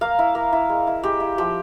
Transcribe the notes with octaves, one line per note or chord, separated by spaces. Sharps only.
A#3 F5
E4
A#3
E4
G#3
E4
G#3 G4
E4
F3 G4